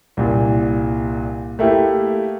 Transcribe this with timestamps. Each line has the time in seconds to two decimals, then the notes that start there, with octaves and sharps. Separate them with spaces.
0.17 C2 A#2
1.59 A3 A#3 E4 G4